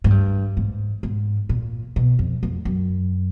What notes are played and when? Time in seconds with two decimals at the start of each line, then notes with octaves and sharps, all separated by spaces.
0.04 G#2
0.10 G2
0.57 G#2
1.03 G#2
1.49 A#2
1.96 B2
2.19 F2
2.43 F2
2.65 F#2